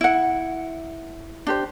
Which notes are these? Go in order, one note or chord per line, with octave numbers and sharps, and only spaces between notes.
E4 F#5
D4 G4 C5